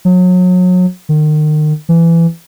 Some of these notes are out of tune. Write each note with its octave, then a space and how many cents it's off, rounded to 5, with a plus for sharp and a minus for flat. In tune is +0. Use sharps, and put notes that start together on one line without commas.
F#3 -30
D#3 -35
E3 +20